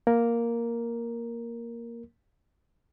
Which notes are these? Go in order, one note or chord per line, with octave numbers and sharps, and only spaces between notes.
A#3 A#4